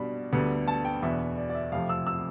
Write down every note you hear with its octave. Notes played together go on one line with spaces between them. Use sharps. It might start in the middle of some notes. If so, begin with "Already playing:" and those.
Already playing: B2 G3 D4 B5
D2 D3 G3 B3
A5
G5
E2 B2 B3 D4 E5
D5
D5
E5
F2 C3 F3 A3 F5
E6
E6